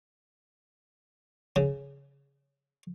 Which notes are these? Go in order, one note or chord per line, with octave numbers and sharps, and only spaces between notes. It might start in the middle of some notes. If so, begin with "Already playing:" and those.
C#3